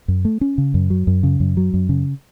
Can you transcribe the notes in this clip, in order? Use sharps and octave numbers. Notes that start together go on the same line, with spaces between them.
F#2
A3
C#4
C#3
F#2
F#3
F#2
C#3
F#2
F#3
F#2
C#3